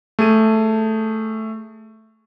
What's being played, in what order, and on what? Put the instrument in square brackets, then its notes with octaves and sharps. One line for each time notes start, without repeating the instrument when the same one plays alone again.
[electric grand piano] A3 G#4 D#7